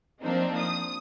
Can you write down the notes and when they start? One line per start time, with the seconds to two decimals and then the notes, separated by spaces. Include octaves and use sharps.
0.22 F3 A#3 C4 D4 D#4
0.58 D#6